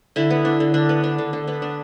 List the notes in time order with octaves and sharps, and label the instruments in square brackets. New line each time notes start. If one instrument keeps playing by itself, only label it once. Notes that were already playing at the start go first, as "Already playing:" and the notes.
[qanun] D3 E4
B3
D4
D3
D3 D4
B3
D4
D3
D3
B3
D4